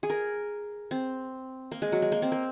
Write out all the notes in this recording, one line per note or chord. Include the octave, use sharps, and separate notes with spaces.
G#4
A#4
C4
A#3
G#3
F#3
G#3
A#3
C4
A#3